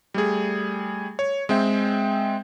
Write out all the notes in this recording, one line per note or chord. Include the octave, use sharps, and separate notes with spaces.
G3 A3 G#4
C#5
G#3 C4 E5 G5